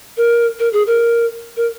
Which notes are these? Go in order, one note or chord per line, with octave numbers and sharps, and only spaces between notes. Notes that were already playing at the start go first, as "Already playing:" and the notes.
A#4
A#4
G#4
A#4
A#4